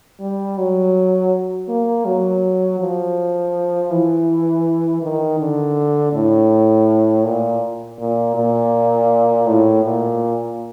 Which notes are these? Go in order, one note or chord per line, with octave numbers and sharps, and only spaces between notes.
G3
F#3
A#3
F#3
F3
E3
D#3
D3
A2
A#2
A#2
A#2
A2
A#2